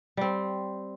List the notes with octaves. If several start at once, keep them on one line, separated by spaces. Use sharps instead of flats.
G3 C4